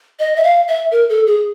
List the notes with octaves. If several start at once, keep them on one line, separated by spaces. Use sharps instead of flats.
D#5
E5
F5
E5
A#4
A4
G#4